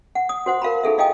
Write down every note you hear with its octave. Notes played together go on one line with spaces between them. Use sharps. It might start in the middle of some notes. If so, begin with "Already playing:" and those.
F#5
D#6
F#4 C5 F#5
A#4 F5 A5 B5
D#4 G#4 A4 E5
E4 D#5 F5 G5 G#5 D#6